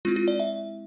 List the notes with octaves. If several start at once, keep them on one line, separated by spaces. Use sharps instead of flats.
G#3 C4 E4 F4
F4
D5
E5